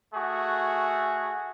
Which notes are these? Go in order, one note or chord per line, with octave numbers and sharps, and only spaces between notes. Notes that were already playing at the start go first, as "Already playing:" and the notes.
A3 F#4 G#4